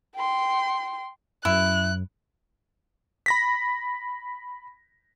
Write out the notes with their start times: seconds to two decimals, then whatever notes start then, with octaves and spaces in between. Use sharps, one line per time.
0.16 G5 C6
1.45 F#2 E4 F#6
3.26 B5 A#6 B6